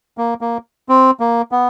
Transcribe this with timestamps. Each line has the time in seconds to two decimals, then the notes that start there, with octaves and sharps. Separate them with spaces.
0.18 A#3
0.41 A#3
0.89 C4
1.20 A#3
1.52 B3